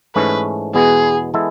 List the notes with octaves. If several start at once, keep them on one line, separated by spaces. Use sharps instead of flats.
G#2 E3 A3 C#4 B4
E2 B2 G#3 B3 G#4
E3 G#3 B3 E4 A4